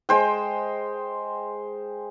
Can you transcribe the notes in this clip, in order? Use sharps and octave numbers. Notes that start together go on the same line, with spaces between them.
G#3 C5 G5